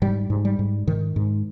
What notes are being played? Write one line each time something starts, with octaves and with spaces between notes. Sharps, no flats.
G#2 G3
G#2
G3
G#2
G#2 D#3
G#2